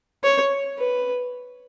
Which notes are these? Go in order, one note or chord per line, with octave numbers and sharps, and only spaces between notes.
C#5
B4